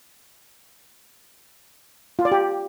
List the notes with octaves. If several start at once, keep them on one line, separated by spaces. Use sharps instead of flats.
F4
D5
G4